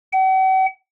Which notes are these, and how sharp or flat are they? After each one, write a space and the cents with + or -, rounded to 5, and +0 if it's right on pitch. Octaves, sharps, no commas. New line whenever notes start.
F#5 +45